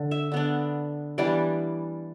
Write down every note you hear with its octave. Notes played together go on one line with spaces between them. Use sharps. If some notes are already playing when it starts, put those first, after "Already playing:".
Already playing: D3
E5
D3 B3 D4
E3 G3 B3 D4 D5